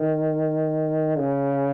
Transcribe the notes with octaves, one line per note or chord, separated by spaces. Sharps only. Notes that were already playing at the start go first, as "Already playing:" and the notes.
Already playing: D#3
C#3